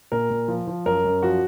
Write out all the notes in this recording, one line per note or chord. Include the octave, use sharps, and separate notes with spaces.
A#2 A#4
A#2
F3
F3
F#2 A#4
F#2
F3 F#4